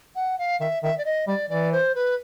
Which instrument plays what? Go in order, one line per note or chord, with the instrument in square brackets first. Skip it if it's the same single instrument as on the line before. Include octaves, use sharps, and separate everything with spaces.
[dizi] F#5
F5
[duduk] D#3 [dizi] E5
[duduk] D#3 [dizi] E5
[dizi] D5
D#5
[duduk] G3 [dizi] D5
[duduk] E3 [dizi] D5
[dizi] C5
B4